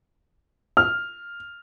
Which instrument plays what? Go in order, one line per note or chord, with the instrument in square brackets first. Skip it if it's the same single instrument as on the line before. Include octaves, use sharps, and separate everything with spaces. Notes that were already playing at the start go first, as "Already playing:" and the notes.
[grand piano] F6